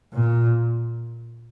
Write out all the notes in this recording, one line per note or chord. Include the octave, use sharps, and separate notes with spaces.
A#2